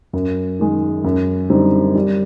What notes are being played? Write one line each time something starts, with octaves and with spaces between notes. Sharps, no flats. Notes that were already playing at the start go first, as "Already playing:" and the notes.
F#2
D#3 G#3
F#2
D3 G3 C4 D#4
G3